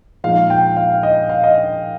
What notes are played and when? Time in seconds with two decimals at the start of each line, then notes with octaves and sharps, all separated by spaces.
0.24 A#2 F3 G#3 D#4 F5
0.50 G5
0.77 F5
1.03 D#5
1.29 F5
1.44 D#5